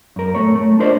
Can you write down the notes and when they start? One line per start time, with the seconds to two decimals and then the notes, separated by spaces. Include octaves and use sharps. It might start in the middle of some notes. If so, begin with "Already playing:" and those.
0.16 F#2 A#4
0.35 A3 C#5
0.55 A3
0.79 D4 F4 A#4 C5 D5 D#5